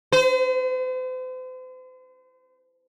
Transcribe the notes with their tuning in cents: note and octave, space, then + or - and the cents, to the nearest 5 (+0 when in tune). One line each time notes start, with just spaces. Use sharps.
C5 -40